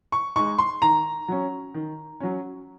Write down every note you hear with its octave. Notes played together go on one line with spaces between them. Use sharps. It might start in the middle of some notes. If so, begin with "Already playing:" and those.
C#6
G#3 D#4 C#6
C6
D#3 A#5
F#3 C#4
D#3
F#3 C#4